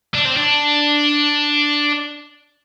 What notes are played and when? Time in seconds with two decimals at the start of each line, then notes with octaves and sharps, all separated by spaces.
0.14 D4
0.25 C4
0.37 D4